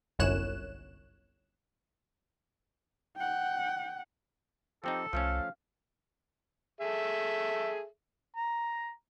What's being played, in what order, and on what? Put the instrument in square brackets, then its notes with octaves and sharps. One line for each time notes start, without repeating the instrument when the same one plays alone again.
[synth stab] G1 C2 F#2 C#5 F#6 E7
[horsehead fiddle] F#5 G5
[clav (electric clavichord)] F3 C4 D#4 [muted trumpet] G4 [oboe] A4
[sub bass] C2 [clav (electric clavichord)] F3 A3 C#4 [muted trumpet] F5
[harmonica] G#4 A4 E5
A#5